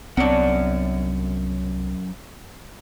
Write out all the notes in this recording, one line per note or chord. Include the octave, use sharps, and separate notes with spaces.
C2 F#2 B3 C4 D4 A#4 C#5 F#5